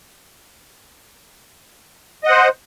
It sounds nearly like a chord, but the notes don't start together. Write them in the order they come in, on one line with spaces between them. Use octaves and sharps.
D#5 F#5 C5